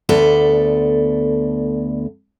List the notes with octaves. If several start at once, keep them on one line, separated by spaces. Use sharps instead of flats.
D2 B3 A4 D5